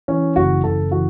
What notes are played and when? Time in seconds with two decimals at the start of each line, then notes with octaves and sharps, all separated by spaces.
0.08 E3 C#4
0.36 F#1 F#4
0.63 F#1 A4
0.91 E3 F#4